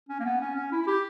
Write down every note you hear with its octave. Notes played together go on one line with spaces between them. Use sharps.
C#4
A#3
B3
C#4
C#4
E4
E4
G4